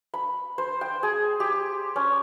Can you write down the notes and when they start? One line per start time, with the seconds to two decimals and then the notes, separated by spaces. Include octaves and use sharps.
0.14 B5
0.58 C5
0.81 G5
1.03 G#4
1.40 G4
1.96 C#4